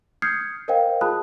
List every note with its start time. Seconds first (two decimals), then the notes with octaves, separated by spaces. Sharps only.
0.22 D#6 F6 G6 G#6 C7 C#7
0.68 A#4 C5 D#5 F5 G5
1.01 F4 G#4 A5 B5 D#6 F#6